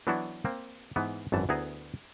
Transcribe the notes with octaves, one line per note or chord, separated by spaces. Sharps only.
E3 F#3 B3 D4 E4 F#4
A#3 C4
G#2 E3 B3
G#1 F#2 E3 A5
D2 B3 E4 G#4 A#5